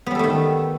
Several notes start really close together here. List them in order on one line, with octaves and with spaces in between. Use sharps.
B3 G3 A4 A3 D#3